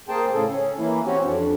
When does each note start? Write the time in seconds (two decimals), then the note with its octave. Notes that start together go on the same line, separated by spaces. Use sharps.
0.09 A#3 G#4 C5 G5 A5
0.33 A2 C#3 G#4 A4
0.50 C#4
0.78 E3 A#3 E4
1.06 C4 C#4 F#4 G4
1.25 F2 D4